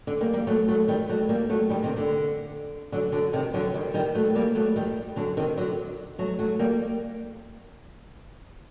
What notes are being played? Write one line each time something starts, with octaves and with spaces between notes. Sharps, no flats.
D3
G3 A#3
G3 A#3
F#3 A3
F#3 A3
D#3 G3
F#3 A3
G3 A#3
F#3 A3
D#3 G3
C3 D#3
D3
D3 F#3
D3 F#3
C3 D#3
D3 F#3
D#3 G3
D#3 G3
F#3 A3
G3 A#3
F#3 A3
D#3 G3
D3 F#3
C3 D#3
D3 F#3
F#3 A3
F#3 A3
G3 A#3